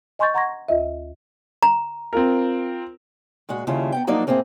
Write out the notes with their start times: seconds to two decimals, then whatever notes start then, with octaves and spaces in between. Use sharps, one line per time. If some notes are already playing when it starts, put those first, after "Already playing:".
0.19 D#5 G#5 C6 C#6 G6 A6
0.34 F#5 A#5 C6 C#6 G#6 A#6
0.68 D2 F4 D#5 E5
1.63 A#5
2.13 C4 F4 A#4
3.49 A#2 G#3 F#4
3.67 D#2 C#3 G3 E4 F4 A5
3.92 B3 F5 G5
4.07 F3 F#3 A#3 D4 D#4 D5
4.27 A2 A#3 C4 G#4 E5